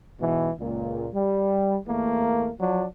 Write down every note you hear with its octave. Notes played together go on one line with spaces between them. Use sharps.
G#2 B2 E3
C#2 A#2
G3
E2 A3 A#3
F3 F#3 D4